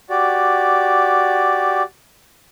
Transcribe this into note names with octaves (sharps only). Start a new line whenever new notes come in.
F#4 G4 D5